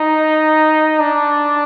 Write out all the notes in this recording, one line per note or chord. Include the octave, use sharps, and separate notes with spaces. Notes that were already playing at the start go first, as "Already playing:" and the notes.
Already playing: D#4
D4